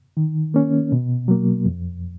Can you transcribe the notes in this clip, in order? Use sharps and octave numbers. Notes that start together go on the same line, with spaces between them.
D#3
A#3 C#4
B2
F#3 A#3
F2